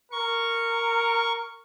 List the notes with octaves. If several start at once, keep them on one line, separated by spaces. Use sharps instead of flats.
A#4 C#6